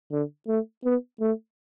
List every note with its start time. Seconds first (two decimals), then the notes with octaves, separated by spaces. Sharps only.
0.12 D3
0.48 A3
0.85 B3
1.21 A3